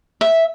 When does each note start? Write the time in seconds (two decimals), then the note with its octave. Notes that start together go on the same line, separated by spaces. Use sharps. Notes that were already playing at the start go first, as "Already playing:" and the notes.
0.21 E5